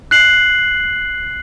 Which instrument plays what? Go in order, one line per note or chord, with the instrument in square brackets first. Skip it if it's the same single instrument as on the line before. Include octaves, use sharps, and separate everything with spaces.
[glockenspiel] F#6 C7 F#7